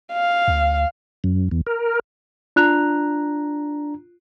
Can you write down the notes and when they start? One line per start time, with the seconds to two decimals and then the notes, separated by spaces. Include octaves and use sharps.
0.13 F5
0.48 D2
1.24 F#2
1.51 E2
1.66 A#4
2.56 D4 F4 A#5 F#6 F7